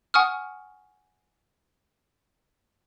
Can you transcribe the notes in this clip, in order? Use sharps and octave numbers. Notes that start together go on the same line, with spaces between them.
F#5 G#5 C#6 D#6 F6